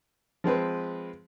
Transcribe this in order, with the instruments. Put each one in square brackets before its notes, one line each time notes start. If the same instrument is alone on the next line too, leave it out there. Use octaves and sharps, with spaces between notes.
[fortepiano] F3 G#3 C4 B4